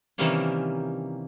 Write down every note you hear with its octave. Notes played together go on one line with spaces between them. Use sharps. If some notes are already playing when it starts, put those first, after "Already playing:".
C3 D#3 E3 G3 A#3 C#4